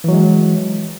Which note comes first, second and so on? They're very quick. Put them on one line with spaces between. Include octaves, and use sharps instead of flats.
E3 F#3 G#3